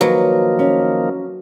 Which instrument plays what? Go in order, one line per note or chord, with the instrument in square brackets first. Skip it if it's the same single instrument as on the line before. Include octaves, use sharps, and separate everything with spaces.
[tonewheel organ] D#3 F3 A#3 [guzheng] F#3 [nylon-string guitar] B4
[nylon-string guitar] C#4